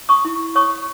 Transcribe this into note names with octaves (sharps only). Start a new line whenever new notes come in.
C#6 D#6
E4
C#5 C#6 D#6